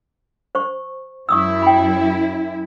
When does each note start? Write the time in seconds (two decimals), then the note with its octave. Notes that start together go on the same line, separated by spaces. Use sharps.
0.55 C5 C#6
1.29 F#2 E4 C#6 D#6 E6
1.62 G5 B5